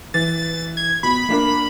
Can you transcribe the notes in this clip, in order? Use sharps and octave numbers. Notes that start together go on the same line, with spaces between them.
E3 A6
G#6
B2 B5
A#3 D4 A#4